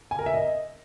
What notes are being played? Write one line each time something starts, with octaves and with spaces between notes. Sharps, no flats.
G#5
A#4
E5
D#5